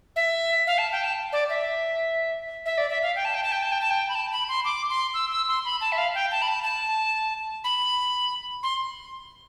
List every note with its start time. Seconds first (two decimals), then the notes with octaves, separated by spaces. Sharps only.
0.16 E5
0.67 F5
0.78 A5
0.92 G5
1.04 A5
1.33 D5
1.49 E5
2.66 E5
2.78 D5
2.90 E5
3.03 F5
3.16 G5
3.25 A5
3.34 G5
3.43 A5
3.52 G5
3.63 A5
3.72 G5
3.81 A5
3.90 G5
4.09 B5
4.15 A5
4.32 B5
4.49 C6
4.65 D6
4.89 C6
5.14 E6
5.31 E6
5.48 C6
5.65 B5
5.81 A5
5.92 E5
5.98 F5
6.14 G5
6.31 A5
6.42 B5
6.48 A5
6.63 A5
7.64 B5
8.63 C6